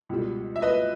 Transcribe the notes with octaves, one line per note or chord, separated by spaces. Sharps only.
C#2 B2 G3
E5
B4 D#5